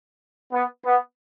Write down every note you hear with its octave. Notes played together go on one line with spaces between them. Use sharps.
B3
B3